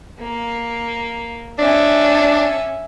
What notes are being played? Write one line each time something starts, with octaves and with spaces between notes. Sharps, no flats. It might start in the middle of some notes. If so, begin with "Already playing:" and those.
A#3
C#4 D4 E5